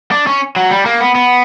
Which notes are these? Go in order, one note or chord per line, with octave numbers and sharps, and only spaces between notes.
D4
C#4
F#3
G3
A#3
B3
B3